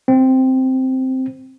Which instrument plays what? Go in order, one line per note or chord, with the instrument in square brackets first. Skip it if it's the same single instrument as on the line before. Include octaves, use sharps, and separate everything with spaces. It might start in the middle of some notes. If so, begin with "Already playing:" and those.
[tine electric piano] C4